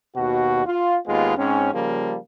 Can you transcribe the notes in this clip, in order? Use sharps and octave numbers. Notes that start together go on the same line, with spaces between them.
D#2 B2 F#4
F4
D#2 G#3 B3 F4
G#2 C4 C#4
C#3 F3 G3 A#3